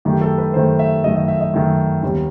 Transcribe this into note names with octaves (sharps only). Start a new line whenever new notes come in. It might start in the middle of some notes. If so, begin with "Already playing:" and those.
F#2 D#3 A3 G4
A4
B4
F#2 D#3 A3 C5
E5
F#2 D#3 A3 D#5
D#5
E5
D#5
F#2 D#3 A3
D#2 D#3 G3 B3